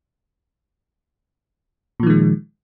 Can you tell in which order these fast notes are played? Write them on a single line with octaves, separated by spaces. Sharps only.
A#2 F3 D#3 G#3